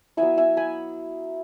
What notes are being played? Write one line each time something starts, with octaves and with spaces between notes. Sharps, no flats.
F#3 B3 E4 E5 G#5
E5 G#5
G#5 B5